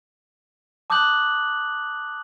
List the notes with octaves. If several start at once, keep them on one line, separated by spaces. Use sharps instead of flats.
A5 D6 D#6 F#6 G6 F#7